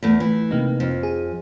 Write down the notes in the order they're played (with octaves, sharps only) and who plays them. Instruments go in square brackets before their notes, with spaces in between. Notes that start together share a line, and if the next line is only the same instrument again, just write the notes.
[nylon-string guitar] E2 A3
E3
[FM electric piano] C3 A#3 D#4
[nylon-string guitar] F2
[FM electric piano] G#4